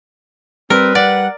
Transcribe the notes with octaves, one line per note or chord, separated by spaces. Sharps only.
G3 C4 A#4 B4
D5 F#5